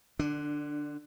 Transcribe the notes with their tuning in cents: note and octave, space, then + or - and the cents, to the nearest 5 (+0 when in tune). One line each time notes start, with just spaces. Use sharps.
D3 +25 D4 +0